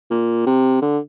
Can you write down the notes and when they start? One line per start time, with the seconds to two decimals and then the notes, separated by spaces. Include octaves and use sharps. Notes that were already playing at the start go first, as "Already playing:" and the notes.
0.10 A#2
0.47 C3
0.82 D3